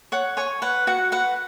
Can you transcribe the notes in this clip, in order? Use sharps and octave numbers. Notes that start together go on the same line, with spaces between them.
C#5 F#5
C#5 G#5 C#6
B4 F#5
F#4 F#5
B4 F#5